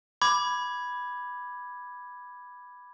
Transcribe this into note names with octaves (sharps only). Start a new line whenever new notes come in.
B5 D6 G#6